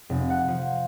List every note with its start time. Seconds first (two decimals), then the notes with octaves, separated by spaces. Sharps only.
0.10 F1
0.30 F#5
0.48 F3